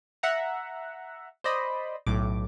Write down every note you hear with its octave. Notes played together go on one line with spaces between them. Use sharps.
E5 F#5 A#5
C5 D5 D#5 B5
B1 A2 D6